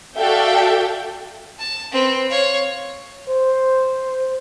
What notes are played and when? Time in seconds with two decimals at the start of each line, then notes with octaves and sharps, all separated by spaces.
0.17 F#4 A4 D5 E5 F5 G5
1.59 A5
1.92 C4 B4
2.30 C#5 F5
3.29 C5